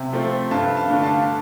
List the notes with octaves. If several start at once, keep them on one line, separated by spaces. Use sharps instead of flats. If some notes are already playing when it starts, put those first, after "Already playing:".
Already playing: C3 E5
F3 A3 C4
G2 F5 A5
F5 A5
D3 A3 D4
F5 A5